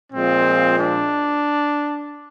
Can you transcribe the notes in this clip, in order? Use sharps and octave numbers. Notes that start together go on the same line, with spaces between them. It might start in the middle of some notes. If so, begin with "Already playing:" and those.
A#2 F3 G#3 C4
D4